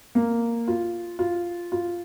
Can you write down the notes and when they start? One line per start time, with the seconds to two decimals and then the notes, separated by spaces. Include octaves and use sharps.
0.15 A#3
0.68 F4
1.19 F4
1.72 F4